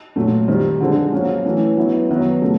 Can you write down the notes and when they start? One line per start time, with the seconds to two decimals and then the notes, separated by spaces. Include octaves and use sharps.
0.16 A#2 F#3 A3
0.48 D#3 G3 C4
0.80 D3 F3 G#3 C4
1.12 F#3 A#3 C#4
1.45 E3 A3 C#4
1.77 F#3 B3 E4
2.10 D#3 F#3 B3
2.42 C#3 F3 A3